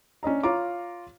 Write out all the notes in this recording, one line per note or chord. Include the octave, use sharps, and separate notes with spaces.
C#4 D4 D#5 A#5
F4 C#5 F5 A#5 D6